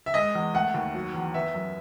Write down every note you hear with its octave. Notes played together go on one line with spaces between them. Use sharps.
E5
G#3 D#5
E2
A3 F#5
D#2
F#3
E2
B3 E5
F#2